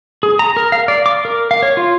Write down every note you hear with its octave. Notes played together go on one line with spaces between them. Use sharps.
G#4
A#5
A#4
F5
D5
D6
A#4
F5
C#5
F4